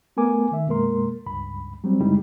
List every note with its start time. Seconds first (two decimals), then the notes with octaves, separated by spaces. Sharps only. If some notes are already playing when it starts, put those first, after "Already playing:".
0.17 A3 B3 A#4 G#5 D6
0.52 D#3 E5
0.67 F#2 B2 G#3 A#3 A#4 C6
1.26 C#2 G2 B5
1.84 F#3 G3 C4
2.00 F#2 C#3 G3 G#3 D#4 E4